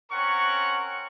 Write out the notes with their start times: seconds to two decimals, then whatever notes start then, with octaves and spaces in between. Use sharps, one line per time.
0.11 C4 C#4 A#4 F#5 C#6